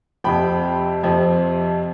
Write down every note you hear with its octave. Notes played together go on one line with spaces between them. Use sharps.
F2 C3 F3 G5 B5
F2 C3 F3